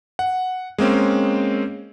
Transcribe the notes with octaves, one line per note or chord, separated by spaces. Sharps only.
F#5
G#3 A#3 C4 C#4